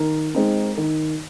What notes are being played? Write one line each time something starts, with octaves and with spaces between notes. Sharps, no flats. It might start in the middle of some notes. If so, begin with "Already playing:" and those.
Already playing: D#3 A#4
G#3 C4 D#4
D#3